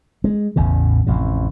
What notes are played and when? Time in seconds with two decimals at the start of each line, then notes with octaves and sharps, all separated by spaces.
0.24 G#3
0.56 A1 E2 A2 C#3
1.07 A1 F2 C3